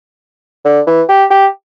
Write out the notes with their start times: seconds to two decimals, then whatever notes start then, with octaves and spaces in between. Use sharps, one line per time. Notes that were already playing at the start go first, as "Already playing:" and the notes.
0.65 D3
0.87 E3
1.09 G4
1.30 G4